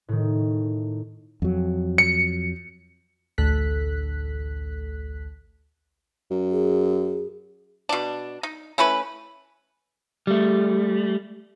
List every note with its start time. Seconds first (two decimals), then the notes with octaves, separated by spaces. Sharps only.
0.09 A2 D#3
1.42 F2 F#3
1.98 C#7
3.38 A1 D2 A4 F#6 B6
6.31 F#2
6.52 G#4
7.89 B2 D4
8.43 D#4
8.78 A3 C#4 E4 B4
10.27 G3 A3